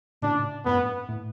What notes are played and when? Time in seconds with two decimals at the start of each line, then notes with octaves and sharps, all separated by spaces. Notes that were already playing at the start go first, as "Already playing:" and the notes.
0.22 A2 C#3 D4
0.65 F#2 A2 B3
1.09 A2